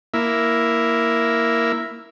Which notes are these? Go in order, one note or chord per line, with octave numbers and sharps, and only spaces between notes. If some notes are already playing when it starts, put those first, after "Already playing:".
A#3 E4